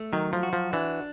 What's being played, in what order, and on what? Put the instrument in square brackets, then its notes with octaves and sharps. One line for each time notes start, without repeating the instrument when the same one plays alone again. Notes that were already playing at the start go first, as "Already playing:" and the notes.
Already playing: [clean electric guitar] A3
[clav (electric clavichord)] D#3 [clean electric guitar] F#3
[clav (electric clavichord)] F3
[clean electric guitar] F#4
[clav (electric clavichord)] F3
[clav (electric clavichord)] E3 [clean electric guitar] D4